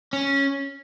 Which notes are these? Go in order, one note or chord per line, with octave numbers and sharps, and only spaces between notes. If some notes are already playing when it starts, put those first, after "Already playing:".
C#4